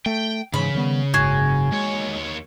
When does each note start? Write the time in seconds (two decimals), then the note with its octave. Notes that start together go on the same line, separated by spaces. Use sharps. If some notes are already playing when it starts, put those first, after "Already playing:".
0.06 A3 G5
0.54 G#2 C#3 E3 B5
0.75 D#3 G3 B3
1.14 F#1 G#2 F#4 G#4
1.72 D#2 G#3 C#5